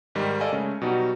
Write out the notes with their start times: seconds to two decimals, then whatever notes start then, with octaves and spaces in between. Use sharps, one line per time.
0.15 G#2 D#3 G3
0.40 A4 A#4 D5 D#5 F5 G#5
0.53 C#3 G#3 A3 C#4
0.82 B2 F#3 G3 D#4 F#4